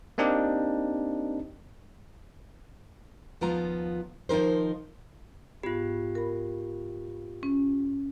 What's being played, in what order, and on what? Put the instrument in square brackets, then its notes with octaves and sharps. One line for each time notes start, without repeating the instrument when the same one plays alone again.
[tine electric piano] A#3 C4 D4 D#4 G4
[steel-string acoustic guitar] D#2 F3 B3 F4 A#5
D#3 F3 D#4 A#4 C5
[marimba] G#2 B3 [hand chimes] F4 G4
[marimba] A#4 B5
C#4